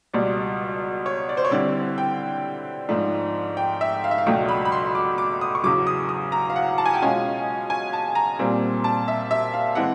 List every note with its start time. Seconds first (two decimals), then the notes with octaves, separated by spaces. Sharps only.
0.13 C#2 B2 G3 D5
1.06 C#5
1.29 D5
1.37 C5
1.45 C#5
1.51 D3 G3 C4 E4 D5
1.98 G5
2.89 G#2 F3 A3 D4
3.57 G5
3.81 E5
4.04 F5
4.11 E5
4.18 F5
4.26 C#2 B2 F#3 A3 D4 G5
4.49 B5
4.65 B5
4.72 C6
4.95 D6
5.18 D6
5.41 D#6
5.55 C#6
5.64 E2 C#3 F#3 D6
5.87 D#6
6.09 D#6
6.32 A#5
6.50 F5
6.56 F#5
6.78 A5
6.86 G#5
6.94 G5
7.01 B2 G#3 C#4 F4 G#5
7.70 G#5
7.93 A5
8.15 A#5
8.39 A#2 G3 C4
8.84 A5
9.08 E5
9.31 E5
9.54 F5
9.75 E3 G#3 C4 F#5